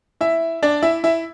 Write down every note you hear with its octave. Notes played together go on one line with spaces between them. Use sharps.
E4 E5
D4 D5
E4 E5
E4 E5